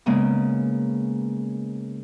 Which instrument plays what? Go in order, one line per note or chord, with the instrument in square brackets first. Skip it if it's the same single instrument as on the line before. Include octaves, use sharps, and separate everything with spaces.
[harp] C#3 G#3 A#3 B3